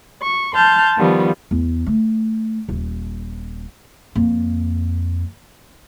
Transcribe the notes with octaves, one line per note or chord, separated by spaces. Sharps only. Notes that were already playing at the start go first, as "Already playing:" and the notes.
C#6
A5 C6 F6 G6
D#3 F3 G3 B3 F4
E2
A3
D#1
F2 A#3